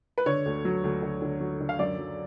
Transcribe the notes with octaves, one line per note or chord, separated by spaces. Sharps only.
B4
D3 C#5
D2
F#3
D2
D3
D3
F#3
D3
F5
F#2 D5
F#3